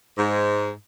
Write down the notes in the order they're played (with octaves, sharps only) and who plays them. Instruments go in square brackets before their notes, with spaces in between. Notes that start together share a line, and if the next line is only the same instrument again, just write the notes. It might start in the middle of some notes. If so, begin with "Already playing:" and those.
[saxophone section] G#2